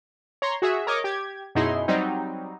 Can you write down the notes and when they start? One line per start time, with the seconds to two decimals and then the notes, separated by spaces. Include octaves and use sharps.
0.42 C#5 A#5 C6
0.62 F#4 G#4 E5
0.87 A#4 C#5 D#5 D6
1.04 G4 G#6
1.55 F#2 B2 D#4 E4 G#4 C6
1.88 F#3 G3 C4 D#4